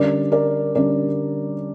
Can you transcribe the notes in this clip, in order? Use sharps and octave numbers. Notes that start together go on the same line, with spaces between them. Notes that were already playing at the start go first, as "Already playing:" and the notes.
Already playing: D3 G3 C#4 A#4 D5
A#4 D5
D3 G3 C#4 A#4 D5